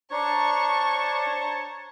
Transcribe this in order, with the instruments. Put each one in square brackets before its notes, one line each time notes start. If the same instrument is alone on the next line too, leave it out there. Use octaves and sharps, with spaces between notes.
[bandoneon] D4 [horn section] C5 C#5 A5 [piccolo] A#5 [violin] C#6